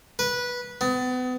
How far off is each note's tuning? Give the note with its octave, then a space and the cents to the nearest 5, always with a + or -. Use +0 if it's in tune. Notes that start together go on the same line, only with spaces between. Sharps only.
B4 -15
B3 +35